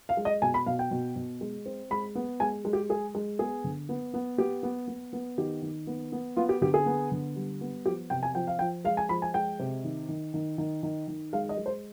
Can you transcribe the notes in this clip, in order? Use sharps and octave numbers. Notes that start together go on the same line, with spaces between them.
F5
G#3
D#5
B2 G#5
B5
B2 F5
G5
B2
B2
G#3
C4
G#3 B5
B3
G#3 G#5
G#3
G4
G#3 G#4
G#3
B3 G#4
D3
B3
B3
B3 G4
B3
B3
B3
D#3 G4
D#3
B3
B3
B3 F4
G4
D3 G4
G#4
B3
D3
G3
B3
F3 G4
C3 G5
G#5
F3 G5
F5
F3 G5
G#3 F5
G#5
F3 B5
G#5
G#3 G5
C3
D#3
D#3
D#3
D#3
D#3
D#3
G#3 F5
D#5
G#3
C5